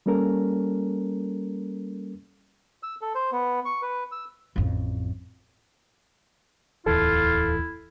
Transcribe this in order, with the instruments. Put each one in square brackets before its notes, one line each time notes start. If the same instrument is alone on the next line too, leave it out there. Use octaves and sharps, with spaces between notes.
[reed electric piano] G3 A#3 C#4 A4 A#4
[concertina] E6
A4
C5
B3
C#6
B4
E6
[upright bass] A1 F2
[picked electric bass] D1 E2 [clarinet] E4 [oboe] F4 [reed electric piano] A4